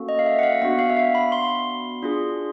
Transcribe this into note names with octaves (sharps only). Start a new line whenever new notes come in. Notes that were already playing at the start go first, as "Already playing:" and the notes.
Already playing: A#3 C#4 F#4 A4
D#5
F5
E5
F#5
F5
B3 D4 F#4 F#5
F5
E5
F5
B5
C6
D4 F4 G#4